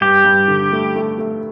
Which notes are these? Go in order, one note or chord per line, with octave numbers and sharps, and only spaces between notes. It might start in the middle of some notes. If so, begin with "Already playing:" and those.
G2 G4
G2
D3
A3
A3
A3